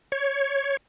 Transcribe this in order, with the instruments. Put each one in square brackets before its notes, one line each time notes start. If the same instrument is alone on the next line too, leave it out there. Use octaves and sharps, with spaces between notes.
[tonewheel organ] C#5